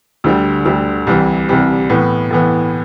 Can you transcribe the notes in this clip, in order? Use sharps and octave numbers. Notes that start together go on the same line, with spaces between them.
D2 D3 G3
D2 D3 G3
C2 C3 E3 G3
C2 C3 E3 G3
A2 E3 B3
A2 E3 B3